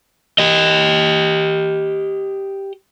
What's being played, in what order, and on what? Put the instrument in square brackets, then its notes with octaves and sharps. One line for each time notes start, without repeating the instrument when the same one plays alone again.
[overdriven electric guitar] G4 D#5